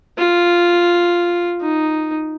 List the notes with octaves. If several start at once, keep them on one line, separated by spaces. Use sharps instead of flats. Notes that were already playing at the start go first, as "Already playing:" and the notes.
F4
D#4